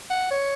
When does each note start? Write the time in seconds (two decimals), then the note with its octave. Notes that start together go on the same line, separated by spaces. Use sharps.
0.10 F#5
0.31 C#5